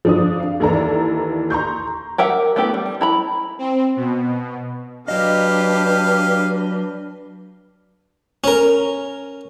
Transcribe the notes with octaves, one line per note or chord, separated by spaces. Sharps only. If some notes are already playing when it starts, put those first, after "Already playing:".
F3 D4 D#6
F5
D#2 E3 E4 A4 D5 A#5
A#5 C6 C#6 G6
G4 A#4 E5 F#5
A3 B3 E4 G4
G3
E4 A#5 B5
C4
B2
F#3 D4 G4 B4 D#5 F5
C#4 A#4